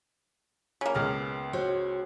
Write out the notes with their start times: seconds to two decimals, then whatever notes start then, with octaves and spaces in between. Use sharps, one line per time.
0.81 C#3 A#3
0.95 C#2 B3 G#4 F6
1.53 F#4 C5 C#5